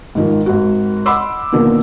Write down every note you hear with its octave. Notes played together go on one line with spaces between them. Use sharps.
G#2 D#3 F3
G#1 F#4
D#5 F#5 B5 C6 D6 E6
A#2 D3 D#3 F3 A#3 B3